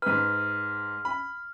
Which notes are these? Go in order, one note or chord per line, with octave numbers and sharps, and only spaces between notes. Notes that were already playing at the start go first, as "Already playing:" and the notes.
G#2 B4 F6
B5